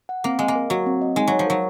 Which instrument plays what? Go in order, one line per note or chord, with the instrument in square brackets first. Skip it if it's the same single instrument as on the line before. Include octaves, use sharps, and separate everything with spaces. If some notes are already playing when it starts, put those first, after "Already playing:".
[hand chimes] F#5
[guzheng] A#3 [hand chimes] C4
[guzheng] G#3 [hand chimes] D#5
[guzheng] A#3
[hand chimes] A#4
[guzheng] F#3 [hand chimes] F#4
[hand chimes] C4
D#5
[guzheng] G#3 [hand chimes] D#4
[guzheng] F#3 [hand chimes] C#5
[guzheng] F3
[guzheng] F#3 [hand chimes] A#4